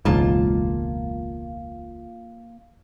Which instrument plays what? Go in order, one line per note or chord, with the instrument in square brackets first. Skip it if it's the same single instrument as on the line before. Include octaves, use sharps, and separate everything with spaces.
[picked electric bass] E1 C#2 G#2 [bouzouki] A#3 F4 A5